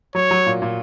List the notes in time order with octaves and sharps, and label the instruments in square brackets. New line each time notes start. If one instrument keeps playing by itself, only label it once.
[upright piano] F#3 [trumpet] C#5
[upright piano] F#3
A#2
A#2